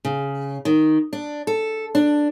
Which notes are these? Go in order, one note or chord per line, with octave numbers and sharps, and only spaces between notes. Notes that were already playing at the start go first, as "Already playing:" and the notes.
C#3
D#3
D4
A4
D4